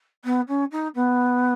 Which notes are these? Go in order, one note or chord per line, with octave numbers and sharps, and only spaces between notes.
B3
C#4
D#4
B3